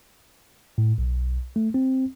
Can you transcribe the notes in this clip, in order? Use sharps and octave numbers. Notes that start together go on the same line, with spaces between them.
A2
B1
A3
C4